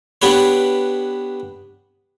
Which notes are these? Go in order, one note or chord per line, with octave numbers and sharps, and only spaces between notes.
B3 D4 G4 B4 C#5